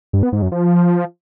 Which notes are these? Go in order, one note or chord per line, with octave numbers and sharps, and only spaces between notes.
G2
B3
G#2
F#2
F3